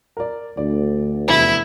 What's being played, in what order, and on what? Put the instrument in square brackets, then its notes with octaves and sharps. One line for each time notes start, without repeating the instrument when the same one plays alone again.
[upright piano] A#4 D5
[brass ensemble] D2 [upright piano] D5
[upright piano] F1 E2 D3 [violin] E4